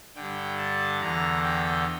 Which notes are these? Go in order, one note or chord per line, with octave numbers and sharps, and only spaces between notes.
G2 D3 G5
A5
E2 D3 A#5
G5